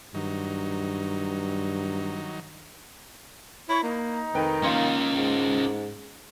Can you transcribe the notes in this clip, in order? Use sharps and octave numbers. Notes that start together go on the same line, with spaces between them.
G2 D#3 F#3 D#4
E4 C#5
A#3 D#4
F1 D#3 B4 G5
A#3 C#4 F4 C6
G#2